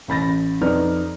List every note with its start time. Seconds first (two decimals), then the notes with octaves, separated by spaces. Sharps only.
0.08 A1 B5 A6 A#6
0.61 F2 D#4 B4 D5 F6